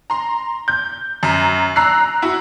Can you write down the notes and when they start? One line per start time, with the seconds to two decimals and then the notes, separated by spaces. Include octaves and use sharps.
0.10 A#5 C6
0.68 G6
1.23 F#2 A#5
1.76 A#5 E6 F#6 C7
2.22 E4 F#4